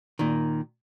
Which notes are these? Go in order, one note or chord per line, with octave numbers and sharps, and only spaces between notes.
A#2 D#3